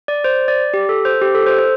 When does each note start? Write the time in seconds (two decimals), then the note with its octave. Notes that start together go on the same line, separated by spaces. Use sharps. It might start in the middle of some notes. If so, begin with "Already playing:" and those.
0.08 D5
0.24 C5
0.48 D5
0.74 G4
0.89 A4
1.05 C5
1.22 G4
1.35 A4
1.46 C5
1.59 C5